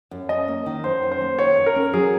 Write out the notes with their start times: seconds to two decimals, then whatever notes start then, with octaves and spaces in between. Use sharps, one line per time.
0.11 F#2
0.29 C#4 D#5
0.48 A#3
0.66 D#3
0.84 F#2 C5
1.03 C#4
1.12 C5
1.21 A#3
1.39 D#3 C#5
1.57 F#2
1.66 A#4
1.76 C#4
1.93 F#3 G#4